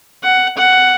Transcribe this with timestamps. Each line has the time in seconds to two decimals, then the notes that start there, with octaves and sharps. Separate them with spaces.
0.23 F#5
0.57 F#5